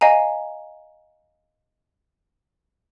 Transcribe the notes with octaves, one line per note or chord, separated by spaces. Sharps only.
D#5 F5 G#5 A#5